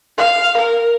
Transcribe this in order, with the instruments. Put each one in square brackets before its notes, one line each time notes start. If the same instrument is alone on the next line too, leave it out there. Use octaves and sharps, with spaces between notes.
[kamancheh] F5
A#4